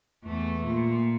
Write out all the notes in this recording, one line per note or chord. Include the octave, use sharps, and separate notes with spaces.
E2 A3
A#2